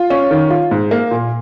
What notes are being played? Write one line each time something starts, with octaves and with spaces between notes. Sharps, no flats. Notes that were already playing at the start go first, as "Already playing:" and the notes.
Already playing: F4
C#4
D#3
F4
G#2
A#3
A#2